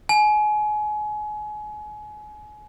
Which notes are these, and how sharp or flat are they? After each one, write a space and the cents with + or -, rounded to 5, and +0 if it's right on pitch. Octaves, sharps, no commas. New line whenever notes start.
G#5 +30